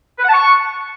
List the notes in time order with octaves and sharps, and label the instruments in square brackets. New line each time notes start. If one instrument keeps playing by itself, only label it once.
[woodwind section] B4
F#5
A5
C#6